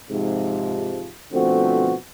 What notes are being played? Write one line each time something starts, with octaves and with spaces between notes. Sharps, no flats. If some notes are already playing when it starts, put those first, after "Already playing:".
G#2 C3 F3
B2 D3 F3 A3 C4 F#4